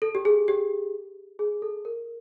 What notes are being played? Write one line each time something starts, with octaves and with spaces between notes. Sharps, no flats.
A4
G4
G#4
G4
G#4
A4
A#4